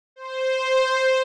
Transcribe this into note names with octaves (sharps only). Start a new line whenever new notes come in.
C5